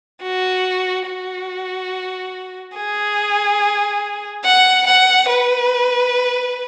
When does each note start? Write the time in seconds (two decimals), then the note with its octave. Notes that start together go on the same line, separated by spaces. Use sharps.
0.23 F#4
1.08 F#4
2.76 G#4
4.44 F#5
4.87 F#5
5.29 B4